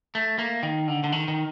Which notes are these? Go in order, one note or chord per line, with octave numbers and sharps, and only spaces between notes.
A3
A#3
D#3
D3
D3
D#3
D#3